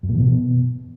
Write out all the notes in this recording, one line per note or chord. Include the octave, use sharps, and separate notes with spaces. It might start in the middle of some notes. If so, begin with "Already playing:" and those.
F#2
A#2
E3
B2